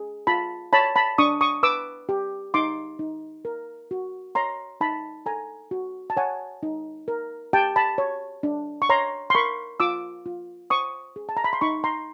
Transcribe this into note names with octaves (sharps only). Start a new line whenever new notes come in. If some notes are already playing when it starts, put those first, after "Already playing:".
Already playing: G#4
F4 A5 B5
C#5 A5 B5
A5 B5
D4 C#6 D#6
C#6 D#6
B4 D6 E6
G4
D#4 C6 D6
D#4
A#4
F#4
C#5 A#5 C6
D#4 A5 B5
A4 G#5 A#5
F#4
A5
C#5 F#5 G#5
D#4
A#4
G4 G5 A5
A5 B5
C#5
D4
C#6
C#5 A#5 C6
C6
A#4 B5 C#6
F4 D6 E6
F4
C5 C#6 D#6
G#4
A5
A#5
B5
C6
D#4 B5 C#6
A#5 C6